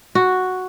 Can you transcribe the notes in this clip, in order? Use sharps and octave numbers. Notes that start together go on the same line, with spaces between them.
F#4